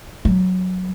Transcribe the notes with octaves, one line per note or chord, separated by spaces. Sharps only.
F#3